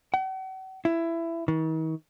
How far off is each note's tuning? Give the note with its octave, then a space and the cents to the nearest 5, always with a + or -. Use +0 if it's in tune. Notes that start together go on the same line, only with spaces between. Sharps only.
F#5 +45
E4 +15
D#3 +45